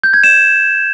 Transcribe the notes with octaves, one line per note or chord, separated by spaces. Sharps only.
G6
G#6
E7